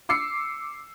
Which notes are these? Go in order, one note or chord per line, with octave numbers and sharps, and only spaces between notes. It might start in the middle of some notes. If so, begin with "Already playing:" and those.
D6 E6 C7 C#7